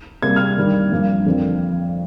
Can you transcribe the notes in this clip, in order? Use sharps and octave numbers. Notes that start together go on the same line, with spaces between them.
C3 G3 A#3 G#6
F6 G#6
G2 D#3 G3
G2 F3 A#3
F2 D3 F3 C4